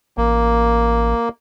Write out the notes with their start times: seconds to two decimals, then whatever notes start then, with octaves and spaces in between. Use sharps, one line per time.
0.18 A1 A#3